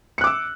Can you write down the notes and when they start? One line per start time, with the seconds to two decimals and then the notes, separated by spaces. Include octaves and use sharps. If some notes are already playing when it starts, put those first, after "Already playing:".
0.18 C#7
0.21 F#6
0.24 D6
0.27 E6